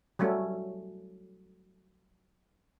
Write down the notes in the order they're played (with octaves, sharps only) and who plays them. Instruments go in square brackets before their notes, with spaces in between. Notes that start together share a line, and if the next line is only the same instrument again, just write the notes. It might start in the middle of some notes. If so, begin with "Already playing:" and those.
[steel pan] F#3 G3 A3 C#4